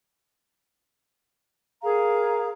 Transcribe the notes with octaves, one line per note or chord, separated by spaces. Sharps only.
G#4 A#4 F5 A#5